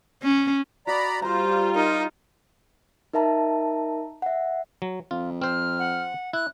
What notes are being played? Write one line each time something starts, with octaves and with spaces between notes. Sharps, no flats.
C#4
F#4 D5 D#5 A#5 B5
G3 F4 C5 A#5 C6
D#4 A#4
D#4 A#4 E5 A5 A#5
E5 F#5
F#3
F2 F4
C4 C5 F6
F#5
E4 F#6